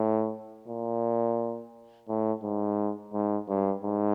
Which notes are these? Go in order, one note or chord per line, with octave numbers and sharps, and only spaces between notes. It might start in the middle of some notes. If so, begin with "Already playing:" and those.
Already playing: A2
A#2
A2
G#2
G#2
G2
G#2